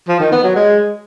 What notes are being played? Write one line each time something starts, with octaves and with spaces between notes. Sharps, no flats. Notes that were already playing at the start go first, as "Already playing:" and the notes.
F3
D#3
B3
F#3
G#3